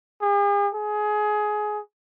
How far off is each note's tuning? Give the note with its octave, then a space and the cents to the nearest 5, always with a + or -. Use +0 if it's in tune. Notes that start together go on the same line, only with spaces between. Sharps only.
G#4 -45
G#4 +20